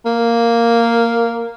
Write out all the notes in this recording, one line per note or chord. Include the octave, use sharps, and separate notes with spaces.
A#3